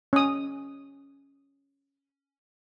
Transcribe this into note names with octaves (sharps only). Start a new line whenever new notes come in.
C#4 D#6